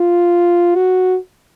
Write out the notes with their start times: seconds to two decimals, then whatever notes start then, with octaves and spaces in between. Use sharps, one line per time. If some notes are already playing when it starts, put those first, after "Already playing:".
Already playing: F4
0.76 F#4